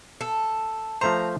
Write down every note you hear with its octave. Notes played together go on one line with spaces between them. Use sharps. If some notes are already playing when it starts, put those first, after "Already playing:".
A4
F3 A3 C5 A#5